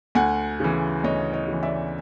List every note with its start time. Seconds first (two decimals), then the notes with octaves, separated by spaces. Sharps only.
0.15 D2 F#5 G#5
0.60 C#3 E3
1.04 D2 C#5 D#5
1.33 C#5 D#5
1.48 C#3 E3
1.63 D5 E5